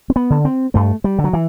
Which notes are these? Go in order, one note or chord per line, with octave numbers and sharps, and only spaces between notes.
C4
B3
D3
C4
G2 A3
G3
D3
F#3
E3